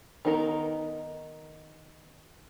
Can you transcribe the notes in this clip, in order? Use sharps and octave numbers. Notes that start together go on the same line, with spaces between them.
D#3 B3 D#4 A#4 A#5